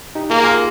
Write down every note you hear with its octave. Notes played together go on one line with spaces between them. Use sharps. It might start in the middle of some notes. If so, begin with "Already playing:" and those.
D#4 G4
A#3 F4 G#4
F4 G#4